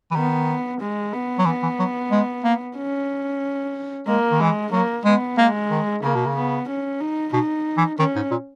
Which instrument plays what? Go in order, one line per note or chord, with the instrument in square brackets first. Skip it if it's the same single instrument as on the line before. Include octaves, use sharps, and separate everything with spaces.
[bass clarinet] E3
[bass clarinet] D#3 [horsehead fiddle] B3
[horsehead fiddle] G#3
B3
[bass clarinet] F#3
[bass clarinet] E3 [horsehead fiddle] B3
[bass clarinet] E3
F#3
G#3
A#3
[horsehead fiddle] C#4
[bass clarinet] G#3 [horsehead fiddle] A#3
[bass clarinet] D#3
[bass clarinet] E3 [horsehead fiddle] G#3
[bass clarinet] F#3 [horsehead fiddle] A#3
[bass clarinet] G#3 [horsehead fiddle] B3
[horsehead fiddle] G#3 [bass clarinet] A#3
[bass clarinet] D#3
[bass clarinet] C#3 [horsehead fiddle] A#3
[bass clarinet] B2
C#3
[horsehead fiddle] B3
C#4
D#4
[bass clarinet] B2 [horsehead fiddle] D#4
[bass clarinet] E3
[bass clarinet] D#3 [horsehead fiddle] C#4
[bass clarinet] G#2
A#2